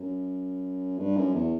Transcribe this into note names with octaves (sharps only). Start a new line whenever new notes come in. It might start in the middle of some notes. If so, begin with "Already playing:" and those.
Already playing: F#2
G2
F#2
E2